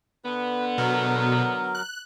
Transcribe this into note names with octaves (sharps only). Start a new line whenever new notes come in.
D3 B3 B4
B2 F#3 A#4
F#6